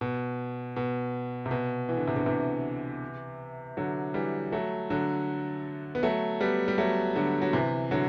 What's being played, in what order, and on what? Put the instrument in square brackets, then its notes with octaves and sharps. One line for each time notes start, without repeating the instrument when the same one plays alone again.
[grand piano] B2
B2
C3
B2
E3
D3
C3
B2 D3
C3 E3
D3 F#3
E3 G3
F#3 A3
D3 F#3
B3
F#3 A3
G3 B3
G3
F#3 A3
D3 F#3
F#3
C3 E3
D3 F#3